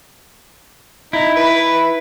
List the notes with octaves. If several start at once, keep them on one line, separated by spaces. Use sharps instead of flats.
D#4 E4
B4